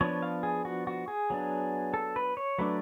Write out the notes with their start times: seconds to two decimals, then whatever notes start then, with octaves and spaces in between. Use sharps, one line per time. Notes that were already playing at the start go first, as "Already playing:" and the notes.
0.01 F3 B3 D4 C#5
0.22 F5
0.43 G#4
0.65 F#4
0.87 F#4
1.08 G#4
1.30 F#3 B3 D4
1.94 A4
2.16 B4
2.37 C#5
2.58 F#3 A3 D4 B4